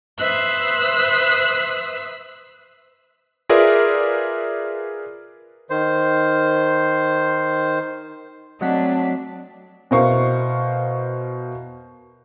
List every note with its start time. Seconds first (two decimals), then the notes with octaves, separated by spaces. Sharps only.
0.19 B4 C5 E5 D#6 E6 F#6
3.49 F4 G#4 A#4 B4 D5 E5
5.70 D#3 C5
8.61 F#3 A3 C4 D4 D#5 F#5 B6
9.91 B2 E4 A#4 C5 F5 C#6